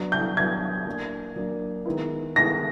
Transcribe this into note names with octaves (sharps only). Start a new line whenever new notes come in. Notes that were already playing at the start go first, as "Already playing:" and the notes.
Already playing: F#3 B3 D4
G6
F#3 B3 D4 G#6
F#3 A#3 D4
F#3 A#3 D4
D#3 G#3 B3 E4
D#3 G#3 B3 E4 A#6